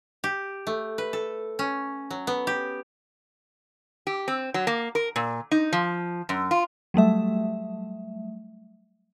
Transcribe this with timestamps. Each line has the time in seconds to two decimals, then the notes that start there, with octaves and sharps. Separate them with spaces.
0.24 G4
0.67 A3
0.98 B4
1.13 A4
1.59 C#4
2.11 F#3
2.27 B3
2.47 G4
4.07 G4
4.28 C4
4.54 F#3
4.67 A#3
4.95 A#4
5.16 A#2
5.51 D#4
5.73 F3
6.29 F#2
6.51 F4
6.94 F#3 G3 A3 E5